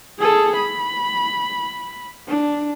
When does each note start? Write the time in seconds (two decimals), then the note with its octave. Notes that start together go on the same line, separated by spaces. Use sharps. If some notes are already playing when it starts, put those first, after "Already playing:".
0.19 G#4 A4
0.56 B5
2.28 D4